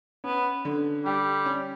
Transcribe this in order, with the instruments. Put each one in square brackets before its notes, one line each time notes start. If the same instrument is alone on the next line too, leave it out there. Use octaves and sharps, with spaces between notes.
[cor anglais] B3 [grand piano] C#4
[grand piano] D3
[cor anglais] G3 [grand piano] G4
[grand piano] C#4